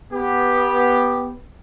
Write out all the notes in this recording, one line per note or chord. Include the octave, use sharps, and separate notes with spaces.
B3 G4